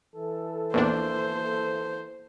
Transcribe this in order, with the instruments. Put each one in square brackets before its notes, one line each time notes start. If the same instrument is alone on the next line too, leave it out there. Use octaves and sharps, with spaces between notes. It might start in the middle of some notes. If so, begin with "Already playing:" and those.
[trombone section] E3 A4
[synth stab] A#1 E2 D4 [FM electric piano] A#3 [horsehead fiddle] C5